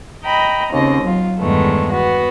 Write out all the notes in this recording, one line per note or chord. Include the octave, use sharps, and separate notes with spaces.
D#5 G5 A#5 B5
D#2 C#3 C4 D#5
F#3 F4
E2 G2 D#3 G#3 A3 B3
B3 F#4